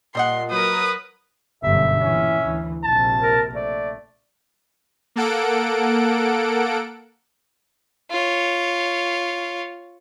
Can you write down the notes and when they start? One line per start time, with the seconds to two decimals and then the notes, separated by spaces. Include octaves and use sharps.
0.15 A#2 G3 D#5 F#5 C6
0.51 F#3 A#4 B4 D#6
1.63 G1 F#2 B2 E5
2.01 A#2 E3 C#4
2.43 D2 E3
2.84 A#1 C3 A5
3.21 A#4
3.54 A3 D5
5.16 A#3 A4 F#5 D7
8.11 F4 C#5